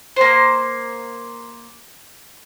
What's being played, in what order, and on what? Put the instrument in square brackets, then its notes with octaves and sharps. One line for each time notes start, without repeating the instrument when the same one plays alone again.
[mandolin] A#3 C5